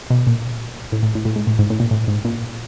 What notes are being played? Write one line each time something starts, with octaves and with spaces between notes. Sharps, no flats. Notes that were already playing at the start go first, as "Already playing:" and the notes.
B2
A#2
A2
A2
A2
A2
G#2
A2
G#2
A2
A#2
A2
G#2
A#2